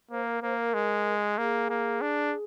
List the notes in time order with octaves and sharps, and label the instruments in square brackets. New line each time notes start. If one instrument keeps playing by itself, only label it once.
[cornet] A#3 [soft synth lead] C5
[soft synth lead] A#4
[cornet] A#3 [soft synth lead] C5
[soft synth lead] A#4
[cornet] G#3
[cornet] A#3 [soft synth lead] G#4
[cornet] A#3
D4